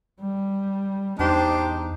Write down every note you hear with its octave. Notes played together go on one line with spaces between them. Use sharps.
G3
E2 D4 D#4 G4 C5